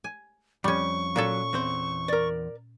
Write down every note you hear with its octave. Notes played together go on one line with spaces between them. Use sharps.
G#5
F2 G3 C#4 C#6
A#2 F#3 C#4 A4
E2 C4 C5
A#4 D5